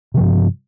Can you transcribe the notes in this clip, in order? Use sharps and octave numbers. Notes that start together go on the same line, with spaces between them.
G2 C3 F3